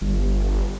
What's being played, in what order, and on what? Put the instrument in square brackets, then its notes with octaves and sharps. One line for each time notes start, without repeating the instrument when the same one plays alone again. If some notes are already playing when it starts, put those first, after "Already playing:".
[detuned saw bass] G1